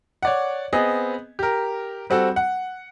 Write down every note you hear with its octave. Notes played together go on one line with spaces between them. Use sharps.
C#5 D5 F#5
B3 C4 G#4 D#5
G4 A#4
G3 C4 F#4 A4
F#5